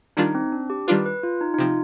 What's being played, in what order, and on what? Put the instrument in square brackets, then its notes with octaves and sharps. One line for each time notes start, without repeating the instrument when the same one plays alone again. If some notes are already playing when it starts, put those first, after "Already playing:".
[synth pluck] D#3 G3 D4 F4 [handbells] D#4
[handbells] C4
D4
G4
[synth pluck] D#3 G3 D4 F4 [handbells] B4
[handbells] B4
F4
D#4
D#4
[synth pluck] C3 F3 C4 [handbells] F4